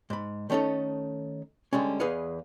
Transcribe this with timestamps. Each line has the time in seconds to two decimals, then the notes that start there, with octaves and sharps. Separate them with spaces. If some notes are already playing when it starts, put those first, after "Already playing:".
0.10 G#2 B5
0.50 D#3 A3 C#4 D#4 A4
1.73 D3 G3 G#3 C#4
2.00 E2 G#4 B4 D#5 F5 F#5